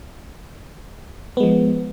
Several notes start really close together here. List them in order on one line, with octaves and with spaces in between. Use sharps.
B3 G#3 F3